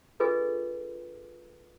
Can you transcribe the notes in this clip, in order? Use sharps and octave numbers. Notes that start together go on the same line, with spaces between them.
D4 F4 G#4 A4 B4 D#5